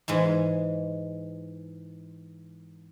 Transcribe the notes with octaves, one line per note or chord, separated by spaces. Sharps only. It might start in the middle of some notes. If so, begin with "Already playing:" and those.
G#2 E3 G#3